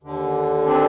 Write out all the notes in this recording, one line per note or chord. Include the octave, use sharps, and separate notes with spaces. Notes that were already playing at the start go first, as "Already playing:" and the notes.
D#2 D3
C4 D4